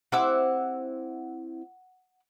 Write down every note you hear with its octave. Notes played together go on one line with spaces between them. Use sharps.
C4 E4 G4 F#5 D6 E6